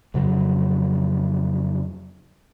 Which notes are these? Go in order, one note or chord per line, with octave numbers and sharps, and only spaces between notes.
F2 C#3 F#3